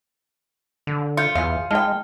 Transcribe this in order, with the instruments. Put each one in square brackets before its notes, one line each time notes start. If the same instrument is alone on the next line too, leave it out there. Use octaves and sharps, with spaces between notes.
[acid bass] D3
[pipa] F4 [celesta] G6 C#7
[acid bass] E2 [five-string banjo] G#4 F5
[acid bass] G#3 [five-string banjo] D#4 G5 [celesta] A5 F6